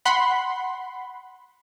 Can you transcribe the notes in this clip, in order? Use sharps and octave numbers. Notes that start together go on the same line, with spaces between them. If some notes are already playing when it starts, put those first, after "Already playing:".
F#5 B5 C6